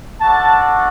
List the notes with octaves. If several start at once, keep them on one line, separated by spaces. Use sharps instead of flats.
A3 D4 F#4 A5